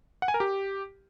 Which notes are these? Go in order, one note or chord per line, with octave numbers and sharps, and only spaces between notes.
F#5
G#5
A#4
G4